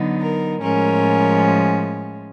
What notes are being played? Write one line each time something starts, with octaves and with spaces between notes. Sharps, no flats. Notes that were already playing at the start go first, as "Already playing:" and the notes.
Already playing: D3 F#3 B3 D#4
A#4
A2 F3 G#3 C#4 A#4